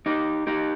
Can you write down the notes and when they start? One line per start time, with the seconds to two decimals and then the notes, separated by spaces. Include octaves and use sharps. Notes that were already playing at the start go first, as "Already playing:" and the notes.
0.06 D#4 G4
0.47 D#4 G4